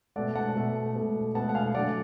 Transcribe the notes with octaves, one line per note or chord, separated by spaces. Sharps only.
B2 A3 D5 F#5
F#5 A5
B2 A3
B2 A3
B2 A3 F#5 A5
F#5
F5 G#5
D3 F#3 A3 D5 F#5